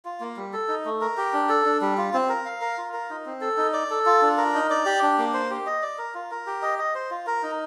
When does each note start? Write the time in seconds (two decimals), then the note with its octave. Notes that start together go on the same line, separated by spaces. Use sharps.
0.05 F4
0.20 A#3
0.37 G3
0.53 A4
0.68 D#4
0.85 A3
1.01 A#4
1.17 G4
1.33 D4
1.49 A4
1.66 D4
1.81 G3
1.98 F4
2.14 C4
2.29 A#4
2.45 F5
2.61 A#4
2.78 F4
2.93 A#4
3.10 D#4
3.26 C4
3.41 A4
3.58 D#4
3.73 D5
3.90 A4
4.06 F4
4.22 D4
4.38 A#4
4.55 D#4
4.70 D5
4.85 G4
5.02 D4
5.18 A#3
5.34 C5
5.50 G4
5.66 D#5
5.82 D5
5.98 A#4
6.15 F4
6.31 A#4
6.47 G4
6.62 D#5
6.79 D#5
6.95 C5
7.11 F4
7.27 A#4
7.43 D#4